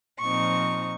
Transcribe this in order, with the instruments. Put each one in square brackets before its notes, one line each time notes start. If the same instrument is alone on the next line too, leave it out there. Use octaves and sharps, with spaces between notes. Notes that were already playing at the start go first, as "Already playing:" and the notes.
[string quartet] A#2 F3 C4 D#4 C#6